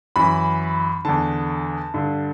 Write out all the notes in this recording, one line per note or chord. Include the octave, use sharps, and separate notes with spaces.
F#2 E3 B5
E2 D3 A5
G2 D3